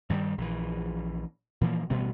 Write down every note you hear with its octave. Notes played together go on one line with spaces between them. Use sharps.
G2 D#3 F3 G3
A#1 E3
A#2 E3 F3 A#3
A1 B2 G3 B3